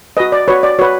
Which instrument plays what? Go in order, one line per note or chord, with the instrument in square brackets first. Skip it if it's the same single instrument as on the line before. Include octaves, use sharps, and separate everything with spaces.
[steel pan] F#4 B4 D#5
D5
F#4 B4 C#5
D5
F#4 B4 C#5